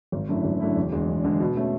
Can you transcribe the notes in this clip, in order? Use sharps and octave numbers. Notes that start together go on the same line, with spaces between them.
G#1
F#2 D3 A3 E4
G#1
F#2 D3 A3 E4
E1
E2 D3 G#3
E1
E2 D3 G#3
B2
A3 C#4